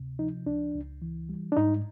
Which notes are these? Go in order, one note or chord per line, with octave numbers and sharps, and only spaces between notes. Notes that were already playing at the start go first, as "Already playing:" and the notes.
Already playing: D2 C3
F3 D#4
C#2 D4
C#2
E3
G3
D4
G#2 D#4